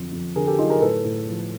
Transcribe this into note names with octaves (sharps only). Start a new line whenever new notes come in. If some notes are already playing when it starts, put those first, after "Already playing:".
Already playing: F2 D3 F#3
F2
D3 G#4 A#4
G4 A4
F#3 D#4 F4
G#4 A#4
A2 A4 B4
A2
F3